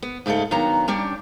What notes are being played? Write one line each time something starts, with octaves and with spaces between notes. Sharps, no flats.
B3
G#2 C#3 A3 G#4 A4
G2 D#3 F#3 B3 A#5
G3 C#4 D4 G4